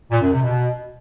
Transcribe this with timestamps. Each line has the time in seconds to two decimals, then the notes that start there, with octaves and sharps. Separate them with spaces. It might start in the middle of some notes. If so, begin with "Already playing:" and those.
0.11 A#2
0.21 F#2
0.32 C3
0.43 B2